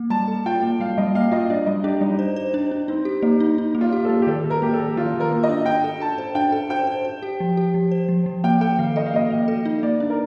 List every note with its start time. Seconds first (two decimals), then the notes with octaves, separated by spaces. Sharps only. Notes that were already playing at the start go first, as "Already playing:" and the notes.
Already playing: A#3
0.10 G3 A5
0.28 A4
0.46 F4 G5
0.62 A#3
0.80 G3 F5
0.98 G3 D#5
1.15 A#3 F5
1.32 F4 D#5
1.50 D4 D5
1.66 G3 D#5
1.84 D4 G4
2.01 G3 D#4
2.19 C5
2.36 C5
2.54 D4
2.71 D4
2.88 C4 D#4
3.05 G4
3.23 A#3 D#4
3.40 D#4
3.58 D#4
3.75 A#3
3.81 F4
3.92 G4
4.05 A4
4.09 A#3
4.22 G4
4.27 D#3 A4
4.44 D#3
4.50 A#4
4.62 A#3 G4
4.73 A4
4.80 D#3
4.97 D#3 F4
5.14 D#3
5.20 A#4
5.32 A#3
5.43 D#5
5.49 D4
5.66 D4 G5
5.84 A4
6.00 A4 A5
6.18 C5
6.35 D4 G5
6.52 A4
6.70 C5 G5
6.87 C5
7.05 C5
7.23 G4
7.40 F3
7.57 G4
7.74 F3
7.91 C5
8.09 F3
8.26 F3
8.44 A#3 G5
8.61 A4 G5
8.79 D#3 F5
8.96 A4 D#5
9.06 F5
9.14 A#3 D#5
9.30 A#3
9.48 A4
9.65 D#4
9.83 A#3 D5
10.00 D4
10.10 A#4